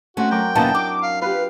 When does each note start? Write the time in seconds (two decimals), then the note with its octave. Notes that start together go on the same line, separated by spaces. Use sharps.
0.17 A3 C4 C#4 F#4 F#5
0.31 F#2 A#4 G5 D6
0.55 D#2 B2 C#4 E4 D#5 A5
0.75 D4 D6
1.03 F5
1.22 F4 G4 B4 F5